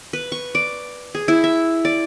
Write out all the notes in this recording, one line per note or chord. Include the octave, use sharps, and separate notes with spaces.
B4
C#6
D5
G#4
E4
E5
D5